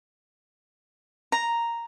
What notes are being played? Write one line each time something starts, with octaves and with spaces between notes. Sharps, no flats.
A#5